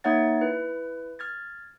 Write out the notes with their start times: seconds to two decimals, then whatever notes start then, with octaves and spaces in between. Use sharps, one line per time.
0.04 A#3 D#4 C#5 E5 F#5 A6
0.41 E4 B4
1.19 F6 G#6 A6